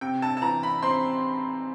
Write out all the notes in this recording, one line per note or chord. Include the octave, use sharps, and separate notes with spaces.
C3 G5
A5
A5
E3 A#5
B5
C4 C6